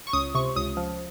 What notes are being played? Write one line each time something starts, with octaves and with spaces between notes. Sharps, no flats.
C#6
C#2 D#6
C3 C#6
C#2 D#6
F3